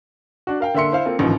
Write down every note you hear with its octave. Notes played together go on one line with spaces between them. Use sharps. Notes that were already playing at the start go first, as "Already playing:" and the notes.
D4 F#4
A#4 F5 G5
D3 A#3 E5 C6 C#7
E4 C5 F5
A#3 C4 F4 A4
A1 D2 G#2 D#3 F3